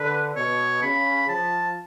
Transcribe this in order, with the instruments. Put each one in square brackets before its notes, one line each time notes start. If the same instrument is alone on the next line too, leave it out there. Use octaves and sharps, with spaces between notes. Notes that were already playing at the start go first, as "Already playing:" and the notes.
Already playing: [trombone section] D3 [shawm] B4
[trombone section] B2 [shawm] C#5
[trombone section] C#3 [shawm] B5
[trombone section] F3 [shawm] A5